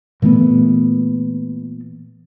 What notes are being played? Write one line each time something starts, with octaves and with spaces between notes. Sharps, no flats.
A#2 E3 A3 B3